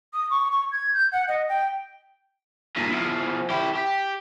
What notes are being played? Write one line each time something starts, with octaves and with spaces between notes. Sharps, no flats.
D#6
C#6
C#6
G#6
G6
F#5
D#5
G5
G2 A#2
E2 F3
E4 G4
G4